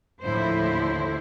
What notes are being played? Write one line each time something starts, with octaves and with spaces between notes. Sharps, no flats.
D#2 A2 D3 F3 E4 C5